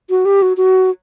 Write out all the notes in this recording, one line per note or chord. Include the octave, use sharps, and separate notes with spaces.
F#4
G4
F#4
F#4